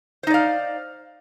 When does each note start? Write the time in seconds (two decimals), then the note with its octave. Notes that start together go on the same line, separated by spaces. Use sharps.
0.23 C5
0.27 D#4
0.30 D5
0.34 F5